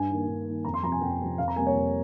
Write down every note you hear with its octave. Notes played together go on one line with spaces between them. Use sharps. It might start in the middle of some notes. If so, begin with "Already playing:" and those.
Already playing: G2 G#5
D#3 A#3
G2
D#3 A#3
F2 A#5
C6
C3 F3 A#5
G#5
F2 G5
C3 F3
F2 F5
A#5
C3 G3 A#3 G#5
C#5
F2